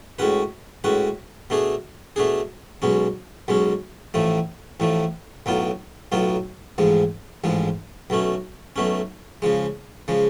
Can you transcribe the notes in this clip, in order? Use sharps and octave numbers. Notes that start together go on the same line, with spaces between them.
A2 G#3 C#4 F#4 B4
A2 G#3 C#4 F#4 B4
B2 A3 D4 G#4
B2 A3 D4 G#4
B1 B2 G#3 C#4
B1 B2 G#3 C#4
A1 A2 F3 A3
A1 A2 F3 A3
B1 A2 F#3 B3 F4
B1 A2 F#3 B3 F4
A1 G#2 F3 G#3
A1 G#2 F3 G#3
B1 B2 A3 C#4
B1 B2 A3 C#4
C#3 F3 G#3
C#3 F3 G#3